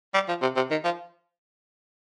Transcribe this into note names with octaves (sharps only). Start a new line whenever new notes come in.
G3
F3
C3
C3
D#3
F3